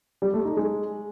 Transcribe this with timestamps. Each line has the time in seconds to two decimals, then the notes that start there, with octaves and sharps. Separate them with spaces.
0.22 G3
0.34 A3
0.45 D#4
0.57 G#3